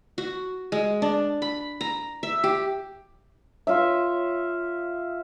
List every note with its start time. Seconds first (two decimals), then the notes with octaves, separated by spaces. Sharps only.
0.18 F#4
0.72 G#3
1.02 D4
1.42 B5
1.81 A#5
2.23 E5
2.44 G4
3.67 F4 C#5 E5